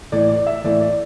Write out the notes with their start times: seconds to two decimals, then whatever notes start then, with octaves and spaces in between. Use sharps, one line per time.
0.12 A2 E3 D5
0.29 D5
0.46 E5
0.64 A2 E3 D5
0.81 D5